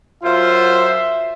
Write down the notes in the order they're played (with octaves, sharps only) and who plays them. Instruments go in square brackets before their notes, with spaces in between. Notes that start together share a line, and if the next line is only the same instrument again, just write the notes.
[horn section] F#2 C5 [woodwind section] F4 [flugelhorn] E5